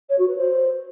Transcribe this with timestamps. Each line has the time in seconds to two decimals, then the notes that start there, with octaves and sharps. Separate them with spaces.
0.09 C#5
0.18 F#4
0.27 B4
0.36 C5